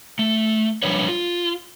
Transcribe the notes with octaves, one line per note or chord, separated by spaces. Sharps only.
A3
F3 G3 D4 B4 C#5
F4